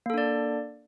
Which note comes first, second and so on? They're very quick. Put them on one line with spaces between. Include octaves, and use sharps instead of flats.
A#3 A4 D4 D5